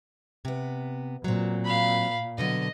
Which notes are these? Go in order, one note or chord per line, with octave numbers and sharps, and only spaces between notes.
C3 B3
A#2 F#3 C4
F5 B5
B2 D3 F#3 D#5